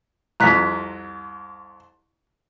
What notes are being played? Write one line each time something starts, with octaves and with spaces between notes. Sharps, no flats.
C2 F2 A#5 F#6 B6